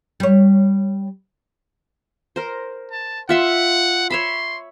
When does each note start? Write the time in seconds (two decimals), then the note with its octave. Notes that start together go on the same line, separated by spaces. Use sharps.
0.20 G3 C#5
2.36 A#4 C5
2.91 A5
3.29 F4 E5 F#5 C6
4.10 C#5 E5 B5 C6